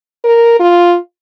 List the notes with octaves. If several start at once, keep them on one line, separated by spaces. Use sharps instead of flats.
A#4
F4